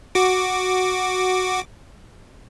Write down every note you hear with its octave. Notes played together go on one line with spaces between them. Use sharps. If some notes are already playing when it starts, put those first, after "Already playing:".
F#4 D6